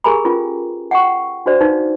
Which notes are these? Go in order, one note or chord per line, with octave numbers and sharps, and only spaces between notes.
G4 G#4 A#4 G#5 A#5 B5
C#4 F4 B4
F#5 G5 C#6
D4 F#4 C5 D5
D#4 B4 F5